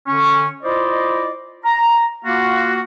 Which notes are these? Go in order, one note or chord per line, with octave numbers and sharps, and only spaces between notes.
D3 C#4 C#6
E4 F4 C5 D5 D#5
A#5
A#3 F4 F#4